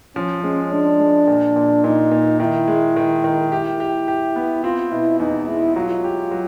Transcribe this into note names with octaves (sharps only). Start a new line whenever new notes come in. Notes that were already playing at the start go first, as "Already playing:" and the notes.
F3 C#4
G#3 C#4
G#3 D4
G#3
A#2
A#2
A#2 D#4
A#2
D#3 E4
G#3
D#3
D#3
E4 G4
G4
G4
B3
C4 F4
B2 E4
E2 D#4
G#3 E4
F#3 F4
G4
F#3